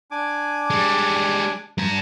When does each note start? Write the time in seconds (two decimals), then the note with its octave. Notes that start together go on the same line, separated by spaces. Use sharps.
0.11 D4 G#5 D6
0.70 G3 G#3
1.78 G2 A5 A#5